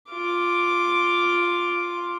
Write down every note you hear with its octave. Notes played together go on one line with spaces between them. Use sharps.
F4 D6